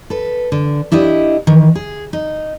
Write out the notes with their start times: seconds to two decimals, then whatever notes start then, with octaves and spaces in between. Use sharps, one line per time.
0.10 A4 B4
0.52 D3
0.92 D4 E4 G4 D#5
1.47 D#3 E3
1.75 G#4
2.13 D#4